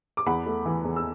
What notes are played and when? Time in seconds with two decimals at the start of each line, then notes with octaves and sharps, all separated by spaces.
0.17 D6
0.26 E2 F#5 B5
0.46 A3
0.65 E3
0.84 E2
0.96 E6